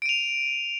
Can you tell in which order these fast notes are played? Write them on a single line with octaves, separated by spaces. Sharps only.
D7 D#7 F7